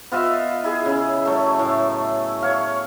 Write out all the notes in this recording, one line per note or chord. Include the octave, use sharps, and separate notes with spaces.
B3 F4 D#5 E5
E4 G#4
C#3
F#3 A3
A2
C#5 F5